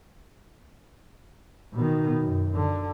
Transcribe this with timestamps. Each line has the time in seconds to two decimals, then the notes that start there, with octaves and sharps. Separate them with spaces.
1.74 B2 D#3
2.22 F#2
2.55 D3